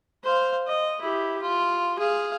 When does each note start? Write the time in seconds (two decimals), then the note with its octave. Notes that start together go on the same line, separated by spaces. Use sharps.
0.24 C5 F5
0.67 D#5
1.01 E4 G4
1.42 F4
1.98 G#4 F5